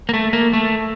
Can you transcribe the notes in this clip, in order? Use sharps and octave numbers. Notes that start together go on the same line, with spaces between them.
A#3
A3
A#3
A3